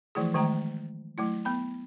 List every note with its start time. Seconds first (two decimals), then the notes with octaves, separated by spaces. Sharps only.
0.15 E3 F3 A3 E4 G#4
0.34 D#3 G#3 A3 G5 A#5
1.18 F#3 A3 E4
1.45 B3 B5